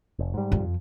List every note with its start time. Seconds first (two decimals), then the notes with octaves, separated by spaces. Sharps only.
0.19 F1
0.34 G#2 G3
0.52 F2